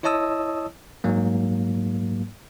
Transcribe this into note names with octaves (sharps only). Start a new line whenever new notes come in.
E4 C#5 D#5 A5 D#6 E6
G#2 F#3 A#3